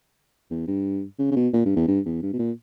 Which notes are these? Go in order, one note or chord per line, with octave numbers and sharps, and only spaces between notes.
E2
G2
C#3
C#3
B2
A#2
G2
E2
G2
E2
G2
B2
A#2